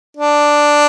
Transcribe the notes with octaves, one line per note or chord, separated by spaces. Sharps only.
D4